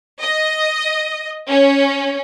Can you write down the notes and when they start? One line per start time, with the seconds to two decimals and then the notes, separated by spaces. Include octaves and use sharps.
0.22 D#5
1.49 C#4